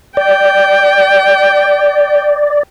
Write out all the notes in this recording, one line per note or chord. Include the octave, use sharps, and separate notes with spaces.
D5 G5